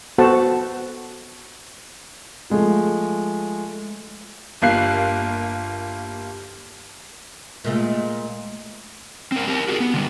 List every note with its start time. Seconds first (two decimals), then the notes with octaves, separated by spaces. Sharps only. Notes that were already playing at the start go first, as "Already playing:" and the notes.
0.18 B3 F#4 A4 C5 F#5 A5
2.50 F3 G#3 A3
4.62 G1 G3 A#3 F4 F#6 C7
7.65 A#2 G#3 A3
9.32 C4 A#4
9.47 G4 A#4
9.69 F#4 G#4 A#4
9.80 B3
9.94 D3 G3